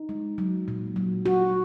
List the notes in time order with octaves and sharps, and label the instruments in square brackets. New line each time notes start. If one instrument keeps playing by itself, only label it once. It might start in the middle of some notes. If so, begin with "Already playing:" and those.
Already playing: [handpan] D#4
G#3
F#3
A#2
F#3
F#4